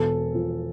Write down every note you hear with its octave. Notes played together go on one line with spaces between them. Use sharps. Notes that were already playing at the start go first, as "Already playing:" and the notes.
Already playing: E1 A4
F3